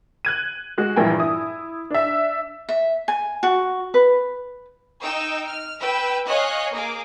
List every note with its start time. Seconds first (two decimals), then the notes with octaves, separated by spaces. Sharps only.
0.25 F#6 G#6 D#7
0.78 G#3 F#4
0.96 A#1 G2 E3 A#3 G5 G#5
1.19 E4 D#6
1.90 D4 E5
2.69 E5
3.08 G#5
3.43 F#4
3.94 B4
5.00 D#4 G5 E6
5.50 F6
5.80 B4 G5 E6
6.26 C#5 D#5 F5 G#5 F#6
6.73 A#3 G#4 D6